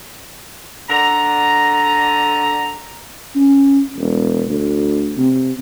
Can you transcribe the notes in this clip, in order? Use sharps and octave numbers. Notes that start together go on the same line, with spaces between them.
D3 A#5
C#4
E1
D2
C3